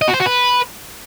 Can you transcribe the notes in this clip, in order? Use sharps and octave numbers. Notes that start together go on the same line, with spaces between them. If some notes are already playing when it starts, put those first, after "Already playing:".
D#5
F#4
C5
F#4
B4